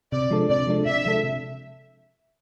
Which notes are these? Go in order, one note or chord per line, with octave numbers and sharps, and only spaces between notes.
C3 D5
F3 G#3 D4 A4
C3 D5
F3 G#3 D4 A4
C3 E5
F3 G#3 D4 A4
C3